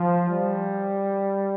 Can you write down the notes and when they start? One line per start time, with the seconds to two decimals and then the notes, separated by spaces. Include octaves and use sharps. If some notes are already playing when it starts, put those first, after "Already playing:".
Already playing: F3
0.29 G3